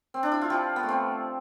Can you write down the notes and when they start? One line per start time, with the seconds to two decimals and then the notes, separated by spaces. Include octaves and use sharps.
0.14 C4
0.23 D4
0.32 E4
0.41 F4
0.50 F3 G4
0.76 B3
0.83 A3
0.89 C4